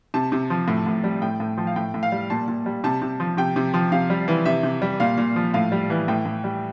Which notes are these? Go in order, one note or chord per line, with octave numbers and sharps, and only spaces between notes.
C3 A5
C3
F3
A2
A2
G3
A2 G5
A2
F3
F5
A2 G5
A2
F5
G3
A#2 A5
A#2
G3
C3 A5
C3
F3
C3 G5
C3
F3
C3 F5
G3
E3
C3 E5
C3
G3
A#2 F5
A#2
F3
A2 F5
G3
E3
A2 G5
A2
G3